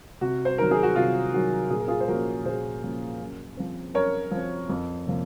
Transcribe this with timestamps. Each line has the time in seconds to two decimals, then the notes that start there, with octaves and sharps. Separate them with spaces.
0.21 C3 F#4
0.45 C5
0.58 D#3 F#3 A#4
0.71 G#4
0.83 F#4
0.96 C3 F4
1.33 D#3 F#3 F#4
1.70 A#2 G#4
1.80 A#4
1.88 F4 G#4
2.00 C5
2.08 F3 A#3 C#4 F#4 A#4
2.45 A#2 G#4 C5
2.83 F3 A#3 C#4
3.20 F#2
3.57 F3 C4
3.94 F#2 A#4 C#5
4.31 F3 C4
4.69 F2
5.07 C3 F3 A#3